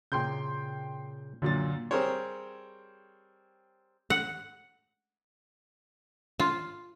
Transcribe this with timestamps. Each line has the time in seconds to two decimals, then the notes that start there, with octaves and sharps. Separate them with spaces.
0.12 A#2 C#3 G5 C6 G6
1.42 F#2 A#2 D3 A6
1.91 G3 C4 G#4 A#4 C5 C#5
4.10 F#5
6.40 F4